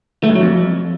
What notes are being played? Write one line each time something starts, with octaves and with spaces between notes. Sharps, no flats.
A3
G2
F#3
F2